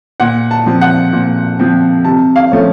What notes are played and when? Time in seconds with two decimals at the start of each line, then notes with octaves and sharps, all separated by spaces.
0.20 A#2 F#5
0.51 A5
0.66 F3 C4
0.81 F#5
1.13 A#2
1.59 F3 C4
2.05 C3 A5
2.36 F5
2.52 F3 A3 C#4